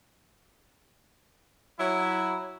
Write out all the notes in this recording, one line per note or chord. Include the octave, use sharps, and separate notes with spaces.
F#3 E4